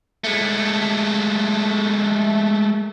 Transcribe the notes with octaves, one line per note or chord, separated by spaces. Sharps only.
G#3 A3